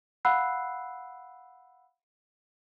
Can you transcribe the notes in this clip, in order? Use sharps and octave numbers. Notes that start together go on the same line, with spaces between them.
F5 F#5 B5 E6 F#6 C7